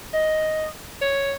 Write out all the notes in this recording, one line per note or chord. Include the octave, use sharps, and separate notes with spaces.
D#5
C#5